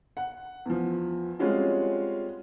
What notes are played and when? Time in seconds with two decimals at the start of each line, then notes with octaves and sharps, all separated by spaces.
0.17 F#5
0.66 E2 F3
1.39 G3 G#3 C4 C#4 F4 F#4